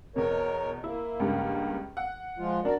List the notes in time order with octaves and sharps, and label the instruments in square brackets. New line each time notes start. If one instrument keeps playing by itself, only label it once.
[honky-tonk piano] E2 B2 [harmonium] A#4 C#5
[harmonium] A#3 [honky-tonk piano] E4
[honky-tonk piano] C#2 G2
F#5
[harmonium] F3 G#3 F4
[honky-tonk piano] D4 [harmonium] F#4 A#4 D5